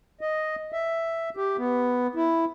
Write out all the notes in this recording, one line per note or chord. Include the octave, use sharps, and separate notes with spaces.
D#5
E5
G4
B3
E4